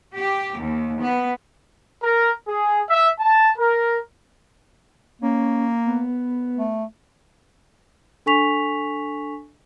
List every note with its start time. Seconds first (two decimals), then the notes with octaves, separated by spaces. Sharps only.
0.14 G4
0.57 D#2
1.00 B3
2.03 A#4
2.47 G#4
2.89 E5
3.19 A5
3.57 A#4
5.22 A#3 C#4
5.86 B3
6.57 A3
8.26 D4 A4 G#5 C#6 B6 F7